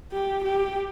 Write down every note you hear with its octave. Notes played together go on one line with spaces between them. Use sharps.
G4
G4